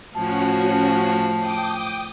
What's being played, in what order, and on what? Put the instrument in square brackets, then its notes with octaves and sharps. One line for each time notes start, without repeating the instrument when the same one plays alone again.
[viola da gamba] A2 F3 [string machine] C#4 F#4 [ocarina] A5
[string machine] G5 D6 D#6